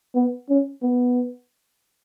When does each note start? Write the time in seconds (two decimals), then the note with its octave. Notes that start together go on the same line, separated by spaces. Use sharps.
0.15 B3
0.49 C#4
0.82 B3